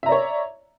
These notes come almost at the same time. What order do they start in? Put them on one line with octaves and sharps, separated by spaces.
E5 A#5 D5 C#5